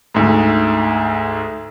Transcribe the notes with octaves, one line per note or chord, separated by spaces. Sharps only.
D2 G#2